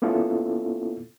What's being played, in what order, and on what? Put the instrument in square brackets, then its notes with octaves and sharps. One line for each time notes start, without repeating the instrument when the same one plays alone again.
[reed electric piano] A#3 B3 C#4 E4 F4 A4